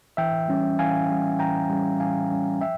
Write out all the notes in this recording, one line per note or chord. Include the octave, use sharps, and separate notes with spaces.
E3 E5 G5
G3 C#4
E3 F5 G#5
G3 C#4
E3 G5 A#5
G3 C#4
E3 F5 G#5
G3 C#4
F3 E5 G5